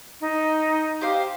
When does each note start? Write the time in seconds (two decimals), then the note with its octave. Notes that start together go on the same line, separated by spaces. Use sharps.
0.21 D#4
1.01 G4 C5 F5